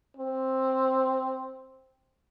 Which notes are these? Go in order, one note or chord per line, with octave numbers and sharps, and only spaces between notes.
C4